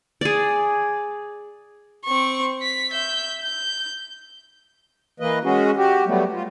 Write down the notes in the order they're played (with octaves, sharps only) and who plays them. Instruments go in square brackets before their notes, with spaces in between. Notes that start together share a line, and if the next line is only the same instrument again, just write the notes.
[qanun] G#4 D5
[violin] C4 C#6
B6
E5 G6
G6
[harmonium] E3 A#3 B4 D#5
G#3 C#4 F#4 G#4
F#4 G4
F#3 G3 A3 B3
F4